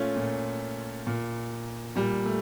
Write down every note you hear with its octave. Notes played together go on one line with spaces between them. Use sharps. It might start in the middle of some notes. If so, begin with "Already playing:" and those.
Already playing: A#2 A3 C#4 F4
A#2
A#2
A#2 G3
A3